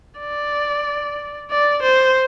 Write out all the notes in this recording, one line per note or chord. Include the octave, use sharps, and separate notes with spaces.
D5
D5
C5